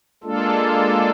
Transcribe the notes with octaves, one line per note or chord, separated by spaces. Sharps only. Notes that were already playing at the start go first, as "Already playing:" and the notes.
G#3 A#3 D4 F4 A4